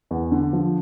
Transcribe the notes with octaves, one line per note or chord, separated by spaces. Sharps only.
E2
D3
F3